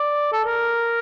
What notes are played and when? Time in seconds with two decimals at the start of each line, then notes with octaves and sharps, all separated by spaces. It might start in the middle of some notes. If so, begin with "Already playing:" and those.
Already playing: D5
0.32 A4
0.45 A#4